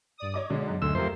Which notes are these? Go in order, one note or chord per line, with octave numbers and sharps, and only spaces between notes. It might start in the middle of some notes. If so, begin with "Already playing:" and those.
G2 D5 D#6
C#5 D#5 D6
B1 D3 G#3
F#2 F#3 A#5
D2 G#3 A3 C6 E6
F2 A3 A#3 G4 C5